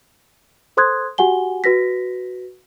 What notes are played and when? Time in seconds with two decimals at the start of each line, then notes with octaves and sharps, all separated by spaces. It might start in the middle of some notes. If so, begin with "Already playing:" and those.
0.77 A4 C5 C6 D#6 F#6 G#6
1.18 F#4 G4 F#5 G#5 G7
1.64 F#4 B4 A#6 B6